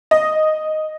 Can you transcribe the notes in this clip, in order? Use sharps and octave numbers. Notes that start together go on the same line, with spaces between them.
D#5